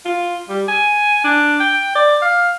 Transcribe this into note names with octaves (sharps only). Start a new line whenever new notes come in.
F4
G3
G#5
D4
G5
D5
F5